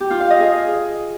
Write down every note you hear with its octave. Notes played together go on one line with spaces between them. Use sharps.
G4
F4
F5
D#5
G#4